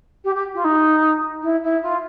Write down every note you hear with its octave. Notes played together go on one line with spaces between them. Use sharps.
G4
G4
F4
D#4
E4
E4
F4